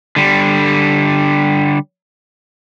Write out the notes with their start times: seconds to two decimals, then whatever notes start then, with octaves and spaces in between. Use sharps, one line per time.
0.16 D3 G3